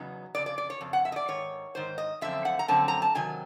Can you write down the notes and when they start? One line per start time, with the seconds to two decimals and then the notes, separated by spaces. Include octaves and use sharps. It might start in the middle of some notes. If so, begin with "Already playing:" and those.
Already playing: E2 C#3 F#3 B3 D#4
0.35 F2 C#3 D5
0.46 D5
0.58 D5
0.70 C#5
0.81 F2 C#3
0.93 F#5
1.05 E5
1.12 D#5
1.16 D5
1.28 G#2 D#3 C#5
1.75 G#2 D#3 C5
1.98 D#5
2.21 F#2 D3 F3 A3 C4 E5
2.45 F#5
2.59 A#5
2.68 F#2 D3 F3 A3 C4 A5
2.88 A#5
3.02 A5
3.15 C3 D#3 F#3 G#5